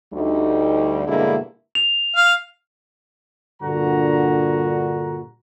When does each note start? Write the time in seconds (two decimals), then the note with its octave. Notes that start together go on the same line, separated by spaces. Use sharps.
0.13 D2 G3 D#4
1.06 G2 B2 D3 G#3 A#3 E4
1.75 F7
2.16 F5
3.62 G2 A#2 D3 F#4 A#5